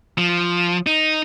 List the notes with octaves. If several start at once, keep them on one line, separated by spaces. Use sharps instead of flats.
F3
D#4